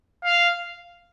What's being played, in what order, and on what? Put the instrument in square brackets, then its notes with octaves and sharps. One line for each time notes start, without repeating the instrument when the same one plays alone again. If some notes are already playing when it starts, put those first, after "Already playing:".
[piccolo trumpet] F5